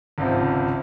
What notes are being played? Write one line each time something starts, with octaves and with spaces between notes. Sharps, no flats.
G#1 C#2 C3 F3